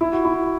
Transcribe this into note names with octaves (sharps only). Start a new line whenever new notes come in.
E4
F#4
E4